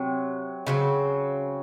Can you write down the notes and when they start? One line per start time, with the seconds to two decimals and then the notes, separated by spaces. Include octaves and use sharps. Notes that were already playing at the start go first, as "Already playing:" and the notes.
Already playing: C3 F#3
0.67 C#3 F#3 C4